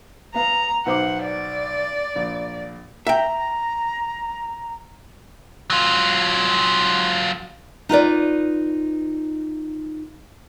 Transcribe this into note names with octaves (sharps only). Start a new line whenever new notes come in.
B3 F5 A#5
B1 C5 F#5 D6
D5
A#1
E5 G5 A#5
F#3 F4
D#4 F4 B4 D5